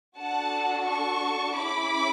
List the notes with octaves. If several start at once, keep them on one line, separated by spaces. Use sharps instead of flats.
D4 F#4 A4 F#5 A5
A5 C#6
C#4 E4 G#4 B5 D6